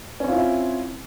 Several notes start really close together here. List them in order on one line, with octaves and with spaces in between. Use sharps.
C#4 C4 F4 E4